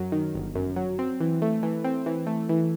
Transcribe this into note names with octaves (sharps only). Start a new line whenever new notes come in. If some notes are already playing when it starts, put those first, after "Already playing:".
Already playing: F#2 F#3
D#3
G1
F#2
F#3
C4
E3
A3
E3
C4
E3
A3
E3